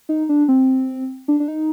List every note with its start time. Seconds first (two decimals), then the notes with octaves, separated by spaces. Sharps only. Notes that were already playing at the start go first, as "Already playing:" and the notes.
0.09 D#4
0.29 D4
0.48 C4
1.28 D4
1.40 D4
1.48 D#4